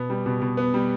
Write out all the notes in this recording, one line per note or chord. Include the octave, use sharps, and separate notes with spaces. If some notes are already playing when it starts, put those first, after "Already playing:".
Already playing: B2 B3
G3
B2
B2
B3
G3